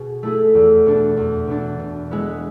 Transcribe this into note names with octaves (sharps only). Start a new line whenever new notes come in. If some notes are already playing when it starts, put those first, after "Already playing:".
Already playing: B2 G#4
A3 E4 G#4
E2
B2 B3 D4
E2
B2 B3 D4
B2
G#3 B3 E4